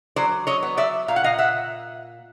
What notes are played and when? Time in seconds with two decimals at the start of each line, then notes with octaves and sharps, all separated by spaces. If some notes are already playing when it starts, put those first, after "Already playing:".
0.16 F#3 C5 D5
0.47 C#5 D#5
0.63 B3
0.77 D5 E5
1.08 A#2 F5
1.16 F#5
1.24 D#5 F5
1.39 E5 F#5